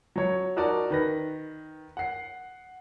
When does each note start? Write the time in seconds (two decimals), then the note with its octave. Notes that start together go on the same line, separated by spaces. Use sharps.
0.16 F#3 C#5
0.56 D#4 F#4 A#4 D5 A5
0.90 D#3 B4 A#6
1.97 F#5 C7